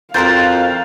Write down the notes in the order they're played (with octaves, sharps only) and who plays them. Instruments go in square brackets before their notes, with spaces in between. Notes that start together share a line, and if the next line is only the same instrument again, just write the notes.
[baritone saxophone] F2 [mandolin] F#4 A#4 C5 [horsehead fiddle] F5 [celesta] A6